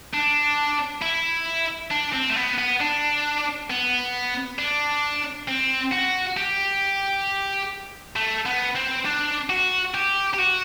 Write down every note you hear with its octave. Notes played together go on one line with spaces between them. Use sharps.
D4
E4
D4
C4
A3
B3
B3
D4
B3
D4
C4
F#4
G4
A3
B3
C4
D4
F#4
G4
G4
F#4